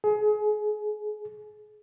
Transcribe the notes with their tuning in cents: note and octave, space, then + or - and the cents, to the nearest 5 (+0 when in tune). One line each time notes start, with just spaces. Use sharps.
G#4 +30